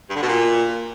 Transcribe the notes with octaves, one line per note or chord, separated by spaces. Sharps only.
G2
D3
B2
A#2